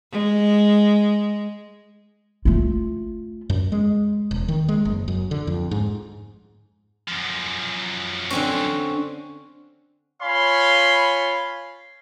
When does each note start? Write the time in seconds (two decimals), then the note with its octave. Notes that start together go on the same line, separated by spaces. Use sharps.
0.11 G#3
2.45 A3 F4
3.50 F#2
3.72 G#3
4.31 E1
4.48 D#3
4.68 G#3
4.85 F#1
5.08 F#2
5.31 D3
5.47 F2
5.71 G#2
7.09 F#2 F3
8.30 D3 C4 C#4
10.22 F4 C#5 F5 G#5 B5 C6